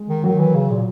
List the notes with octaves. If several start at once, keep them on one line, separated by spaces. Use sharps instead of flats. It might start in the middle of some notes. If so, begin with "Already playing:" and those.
Already playing: G#3
D#3
D#3 F#3
E3
C#3
A#2